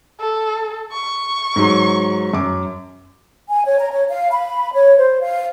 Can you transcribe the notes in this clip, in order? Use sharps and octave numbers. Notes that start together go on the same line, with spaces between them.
A4
C#6
G#2 F#3
F#2 D6
G#5
C#5
A#5
C#5
F5
B5
C#5
C5
F5